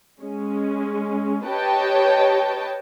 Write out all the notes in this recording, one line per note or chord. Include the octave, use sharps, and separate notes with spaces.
G#3 C#4
G4 B4 C#5 D#5 G5 A5